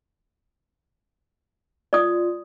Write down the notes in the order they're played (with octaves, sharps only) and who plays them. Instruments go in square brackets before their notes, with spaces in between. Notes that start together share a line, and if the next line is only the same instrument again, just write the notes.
[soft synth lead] F4 [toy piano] D5 D#6